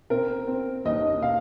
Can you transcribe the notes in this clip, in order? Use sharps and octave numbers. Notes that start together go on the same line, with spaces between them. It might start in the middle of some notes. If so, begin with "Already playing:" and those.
C4 A#4
C4
D#2 D#5
F5